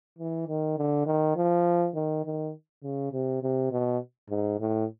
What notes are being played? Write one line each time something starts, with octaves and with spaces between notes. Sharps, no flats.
E3
D#3
D3
D#3
F3
D#3
D#3
C#3
C3
C3
B2
G#2
A2